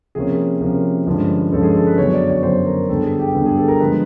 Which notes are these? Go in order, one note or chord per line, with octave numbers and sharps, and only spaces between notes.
C3 F3 A#3 C#4 G#4
C3 F3 A#3 C#4
G2 D3 F3 G#3 C#4
G2 D3 F3 G#3 C#4 A4
G#4
A4
B4
F#2 D3 F#3 B3 C#5
D5
C#5
F#2 D3 F#3 B3 C5
A#4
G2 D3 G3 B3 A4
G#4
G4
G2 D3 G3 B3 G4
G#4
A4
A#4
D3 F3 G#3 B3 B4